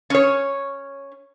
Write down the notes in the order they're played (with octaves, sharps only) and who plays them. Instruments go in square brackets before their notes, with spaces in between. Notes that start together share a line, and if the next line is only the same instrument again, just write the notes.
[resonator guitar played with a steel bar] C#4 C#5